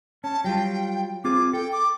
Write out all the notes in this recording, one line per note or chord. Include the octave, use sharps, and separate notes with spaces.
C#4 A5
F#3 G3 F4 G5
C4 F4 G#4 D6
A4 G5
D6